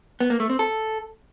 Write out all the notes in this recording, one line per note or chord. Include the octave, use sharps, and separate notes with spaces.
B3
A#3
A3
C4
A4